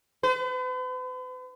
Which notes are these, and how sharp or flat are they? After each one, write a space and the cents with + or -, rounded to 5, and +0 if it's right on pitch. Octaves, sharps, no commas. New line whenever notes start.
B4 +45